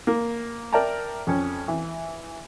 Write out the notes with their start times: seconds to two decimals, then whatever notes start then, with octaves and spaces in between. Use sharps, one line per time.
0.07 A#3
0.73 A#4 D5 E5 G5 A5 A#5
1.27 F2 C#4
1.68 E3